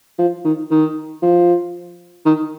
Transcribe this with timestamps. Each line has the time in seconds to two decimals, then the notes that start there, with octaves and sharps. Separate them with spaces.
0.19 F3
0.45 D#3
0.71 D#3
1.23 F3
2.25 D#3